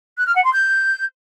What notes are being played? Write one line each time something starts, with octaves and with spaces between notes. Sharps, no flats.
F#6
F6
F#5
C6
G6